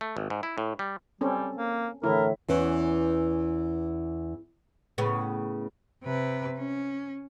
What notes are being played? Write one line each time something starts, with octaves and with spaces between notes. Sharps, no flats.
A3
G#1
G#2
E4
A2
G3
G3 C4 C#4 A4
A#3
A2 D3 E3 E4 A#4
E2 E3 C#4
A2 C#3 B3
C3 B4
C#4